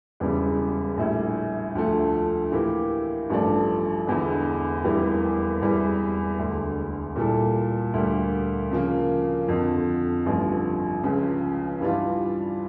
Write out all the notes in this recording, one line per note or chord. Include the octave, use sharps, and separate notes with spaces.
E1 E2 C#3 G3
A#1 A2 G3
D2 D3 F3 A3
A2 E3 A#3 E4 G4
A1 G2 F3 A3 D4
E1 E2 D3
F1 E2 E3 G3 A#3
E1 E2 E3 G3
E1 D2 D3
A#2 G3 A#3 E4 A4
D2 D3 G3 A#3
C#3 F3 A#3
F2 D3 F3
A1 G2 D3 F3
C#2 C#3 F3
G2 E3 G3 D4 F4